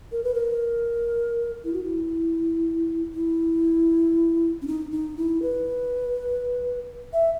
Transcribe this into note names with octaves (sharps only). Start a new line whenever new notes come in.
A#4
B4
A#4
E4
F#4
E4
E4
C#4
D#4
D#4
E4
B4
E5